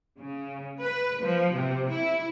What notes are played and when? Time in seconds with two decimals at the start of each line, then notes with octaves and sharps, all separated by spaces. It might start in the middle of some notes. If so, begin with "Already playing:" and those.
0.19 C#3
0.80 B4
1.22 F3
1.54 C3
1.91 E4